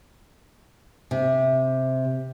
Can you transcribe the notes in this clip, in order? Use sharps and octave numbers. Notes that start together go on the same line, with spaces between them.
C3